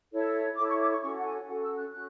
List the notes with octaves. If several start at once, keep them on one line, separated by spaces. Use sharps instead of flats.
E4 A4 C#5
E4 A4 C#5 D6
C#6
D6
C#6
C#4 F#4 A4 C#6
F#5
G#5
C#4 F#4 A4 F#5
E6
F#6
C#4 F#4 F#6